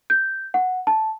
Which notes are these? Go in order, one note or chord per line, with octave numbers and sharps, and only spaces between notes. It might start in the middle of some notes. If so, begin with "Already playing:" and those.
G6
F#5
A5